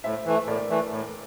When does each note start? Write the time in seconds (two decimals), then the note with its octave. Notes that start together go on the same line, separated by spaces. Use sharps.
0.04 A2 C5 E5
0.25 E3 A3
0.47 A2 A#4 D5
0.70 E3 A3
0.91 A2